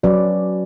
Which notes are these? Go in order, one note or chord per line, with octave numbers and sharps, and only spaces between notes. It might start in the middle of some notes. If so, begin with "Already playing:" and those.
F#3 C#4 F#4 B4 D5